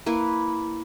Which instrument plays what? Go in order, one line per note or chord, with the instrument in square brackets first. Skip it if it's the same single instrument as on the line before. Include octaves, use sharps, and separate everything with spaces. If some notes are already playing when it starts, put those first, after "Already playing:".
[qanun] A#3 E4 B4